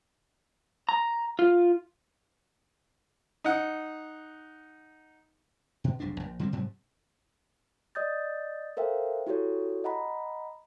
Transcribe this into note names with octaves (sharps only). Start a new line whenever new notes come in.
A#5
F4
D#4 F#5
B2
F1 B1 G#2 D4
A#1
D3 G3 A3 C4
G#2 C3 F#3 G3
D5 D#5 D#6 G6 A6
A4 A#4 C5 E5 F5 G5
E4 F#4 G4 A4 C#5
D#5 F#5 A#5 B5